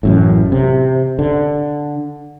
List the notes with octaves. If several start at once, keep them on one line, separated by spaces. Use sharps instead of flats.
A1 F#2 A2
C3
D3